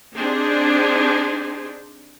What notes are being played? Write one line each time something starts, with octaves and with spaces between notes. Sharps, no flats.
C4 D4 D#4 G4 G#4 C5